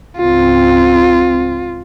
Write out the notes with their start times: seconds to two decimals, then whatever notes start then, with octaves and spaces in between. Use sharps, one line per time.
0.18 C#2 G#2 C4 F4